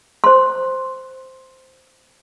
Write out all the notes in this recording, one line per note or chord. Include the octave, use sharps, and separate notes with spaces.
C5 C6